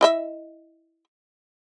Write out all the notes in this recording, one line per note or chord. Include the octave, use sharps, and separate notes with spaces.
E4 D#5 E5